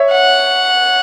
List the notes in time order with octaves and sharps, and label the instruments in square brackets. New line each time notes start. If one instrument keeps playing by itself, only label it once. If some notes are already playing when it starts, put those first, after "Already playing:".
Already playing: [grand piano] C#5 E5
[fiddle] F#5